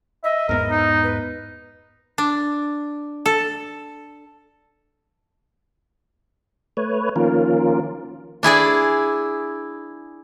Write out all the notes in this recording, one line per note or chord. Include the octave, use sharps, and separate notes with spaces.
D#5 E5
E2 G#2 B3 A#4
D#4
B4
D4
A4
A3 B4 C#5
D#3 F3 A#3 C#4 F4 A#4
D4 E4 G#4 D5